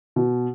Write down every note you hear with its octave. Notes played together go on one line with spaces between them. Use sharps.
B2